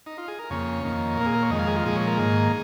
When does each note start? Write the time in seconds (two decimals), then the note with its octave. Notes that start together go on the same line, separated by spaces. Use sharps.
0.06 D#4
0.18 F4
0.28 G#4
0.39 A#4
0.50 F2 C#3 A#3 C#5
0.84 F2 D#3 A#3
1.17 A#2 A#3 A#4
1.26 G#4
1.34 A#4
1.43 C#5
1.50 F2 D#3 G#3 D#5
1.59 F5
1.67 G#4
1.76 F4
1.85 A#2 F3 G#3 G#4
1.96 C#5
2.07 A#4
2.17 G#2 D#3 A#3 G#4